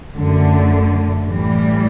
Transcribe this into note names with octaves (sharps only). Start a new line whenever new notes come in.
F#2 D3 A3
A2 E3 G3